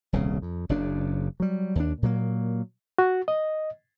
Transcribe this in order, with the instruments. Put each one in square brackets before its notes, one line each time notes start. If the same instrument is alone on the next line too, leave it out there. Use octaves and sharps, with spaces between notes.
[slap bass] D#1 C2 C#3
F2
F#1 F#2 C#3 D4
F#3 G3
D#2 D4
A#2 F#3 A#3
[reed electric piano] F#4
D#5